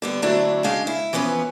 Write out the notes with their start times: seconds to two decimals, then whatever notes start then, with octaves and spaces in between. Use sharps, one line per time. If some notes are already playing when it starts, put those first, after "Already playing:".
0.02 D3 G3 B3
0.22 D3 F#3 A3 C4 D4 E4
0.64 C#3 G#3 D4 F5
0.87 E4
1.13 E3 F3 B3 C#4 B4